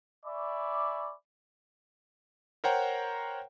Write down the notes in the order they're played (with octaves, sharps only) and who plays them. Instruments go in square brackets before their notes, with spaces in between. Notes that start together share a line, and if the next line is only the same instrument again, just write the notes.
[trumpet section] D5 E5 G#5 B5 C#6 D6
[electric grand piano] A#4 C5 C#5 F#5 G5 A#5